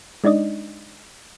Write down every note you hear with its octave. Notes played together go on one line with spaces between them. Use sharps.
G#3 D4 D#4 D5 D#5